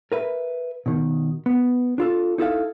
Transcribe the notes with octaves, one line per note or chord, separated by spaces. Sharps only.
A#4 B4 E5
B2 D#3
B3
D4 F4 A4
D#4 E4 A4 F5